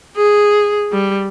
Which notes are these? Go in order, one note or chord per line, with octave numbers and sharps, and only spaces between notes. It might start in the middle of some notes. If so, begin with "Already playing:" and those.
G#4
G3